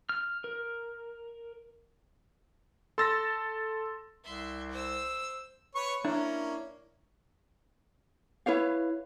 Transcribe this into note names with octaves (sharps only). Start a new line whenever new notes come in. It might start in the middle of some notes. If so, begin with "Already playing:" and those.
F6
A#4
A4 C6 E6 A6 A#6
C2 E5 C6
C5 E6
B4 C#5 C#6
A#3 C#4 D4 E4 A#4
E4 B4 C#5 F5